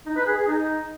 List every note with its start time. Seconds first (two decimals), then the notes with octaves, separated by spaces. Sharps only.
0.06 D#4
0.16 B4
0.27 G#4
0.37 G#4
0.47 D#4